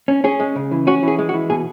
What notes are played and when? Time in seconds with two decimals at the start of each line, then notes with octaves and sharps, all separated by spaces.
0.08 C#4
0.24 C#4 G#4
0.40 G#3
0.56 C#3
0.71 E3
0.87 C#4 F#4
1.03 E3 G#4
1.19 G#3
1.29 F#4
1.34 E3
1.50 B2 G#4